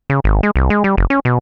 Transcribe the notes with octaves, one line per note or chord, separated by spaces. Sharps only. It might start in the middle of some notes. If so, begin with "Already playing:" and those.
C#3
G#1
G#3
C2
G#3
G3
F#1
C#4
B2